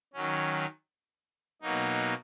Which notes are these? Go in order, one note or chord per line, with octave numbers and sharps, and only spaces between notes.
D#3 F#3 C#4
B2 F#3 A#3 D#4